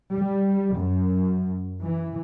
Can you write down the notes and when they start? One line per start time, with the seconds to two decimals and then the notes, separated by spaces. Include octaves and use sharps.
0.13 G3
0.76 F#2
1.82 E3